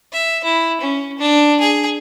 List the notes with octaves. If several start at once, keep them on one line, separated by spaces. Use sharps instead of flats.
E5
E4
C#4
D4
G#4